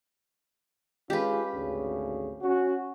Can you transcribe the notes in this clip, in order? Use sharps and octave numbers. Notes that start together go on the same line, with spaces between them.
G#3 C#4 F4 G4 B4
G#1 D2 C#3
C#4 F#4